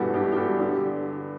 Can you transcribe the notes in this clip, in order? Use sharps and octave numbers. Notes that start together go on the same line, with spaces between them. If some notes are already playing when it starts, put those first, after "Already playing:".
Already playing: G2 B2 E3 F#4 G4 A4 B4
G2 G4
G4
G2 F#4 A4
D3 G4